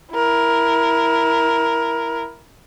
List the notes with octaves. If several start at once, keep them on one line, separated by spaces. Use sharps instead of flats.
E4 A#4